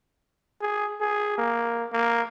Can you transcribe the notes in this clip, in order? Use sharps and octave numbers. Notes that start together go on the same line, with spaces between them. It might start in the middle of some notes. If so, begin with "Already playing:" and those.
G#4
G#4
A#3
A#3